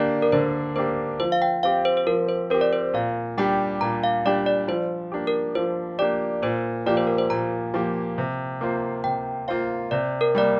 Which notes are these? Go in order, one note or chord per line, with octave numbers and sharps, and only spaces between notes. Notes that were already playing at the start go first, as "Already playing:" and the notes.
Already playing: D3 A#3 D4 G4 D5
A#4
D3 C5
A#3 D4 G4 C5
F3 C5
F5
G5
C4 G4 F5
C5
C5
F3 A#4
C5
C4 G4 A#4
D5
C5
A#2 F5
G3 D4 G4 G5
A#2 A#5
F5
G3 D4 G4 D5
D5
F3 C5
A#3 D4 G4
A#4
F3 C5
A#3 D4 G4 D5
A#2 C5
F3 A#3 G4 D5
C5
A#4
C5
A#2 A#5
F3 A#3 G4
C3
A#3 F4 C5
C3 G5
A#3 F4 C5 F5
C3 D5
A#4
G3 A#3 D5